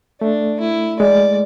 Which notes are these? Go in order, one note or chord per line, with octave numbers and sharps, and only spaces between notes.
A3 D4
E4
G#3 D5